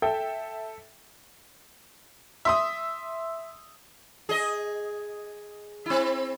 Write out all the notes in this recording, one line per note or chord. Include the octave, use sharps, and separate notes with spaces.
A4 E5 G5
E5 C6 D#6
G#4 D#5
C4 E4